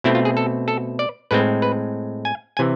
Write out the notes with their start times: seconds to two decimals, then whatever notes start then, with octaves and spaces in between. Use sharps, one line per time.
0.04 B2 A3 C4 E4
0.15 F4
0.25 G#4
0.37 A4
0.68 A4
0.99 D5
1.31 A2 G#3 C4 B4
1.62 B4
2.25 G#5
2.57 C3 E3 G#5